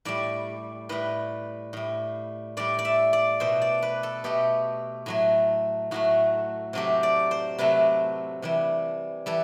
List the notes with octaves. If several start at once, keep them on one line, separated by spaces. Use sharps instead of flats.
A2 G3 D5
A2 G3 B4
A2 G3
A2 G3 D5
D5
E5
D5
B2 A3 C5
D5
B4
A4
B2 A3 G4
A2 F#3 A3
A2 F#3 A3 F#4
C3 F#3 A3 G4
D5
C5
C3 F#3 A3 B4
C3 E3 G3
E3 G3 A4